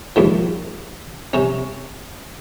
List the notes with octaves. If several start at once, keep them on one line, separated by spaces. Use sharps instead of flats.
D#2 G#2 F3
C3 C#4